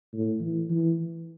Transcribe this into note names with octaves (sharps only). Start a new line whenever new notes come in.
A2
E3
E3